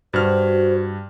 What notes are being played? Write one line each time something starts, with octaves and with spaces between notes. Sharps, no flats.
G2 F#4 C5 F6